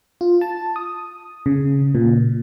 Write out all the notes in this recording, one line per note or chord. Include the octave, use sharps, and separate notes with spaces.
F4
A5
D#6
C#3
A#2